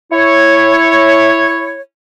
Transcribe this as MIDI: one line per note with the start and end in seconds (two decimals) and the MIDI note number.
0.12 1.79 64
0.12 1.79 73